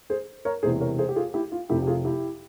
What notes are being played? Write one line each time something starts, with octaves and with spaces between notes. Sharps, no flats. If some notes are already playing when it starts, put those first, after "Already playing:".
G#4 C5
A#4 C#5
E1 E2 C3 E3 G#4 C5
A#4 C#5
G#4 C5
G4
F4 G#4
E4 G4
F4
F1 F2 C3 F3 E4 G4
G4
F4 G#4
E4 G4